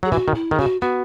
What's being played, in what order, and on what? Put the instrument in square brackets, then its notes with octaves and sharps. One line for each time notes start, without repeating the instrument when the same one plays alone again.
[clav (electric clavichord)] F#3 [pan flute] G#4
[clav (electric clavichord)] E3 [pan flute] F#4
[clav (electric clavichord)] D#3
[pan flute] E4
[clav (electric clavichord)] D#3
[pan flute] G#4
[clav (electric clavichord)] C#3 [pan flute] F#4
[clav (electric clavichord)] B3 [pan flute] F#4